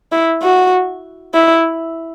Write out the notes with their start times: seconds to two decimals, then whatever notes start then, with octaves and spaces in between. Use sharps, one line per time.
0.12 E4
0.43 F#4
1.34 E4